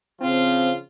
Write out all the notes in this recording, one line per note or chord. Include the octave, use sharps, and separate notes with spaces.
C#3 F3 C4 F4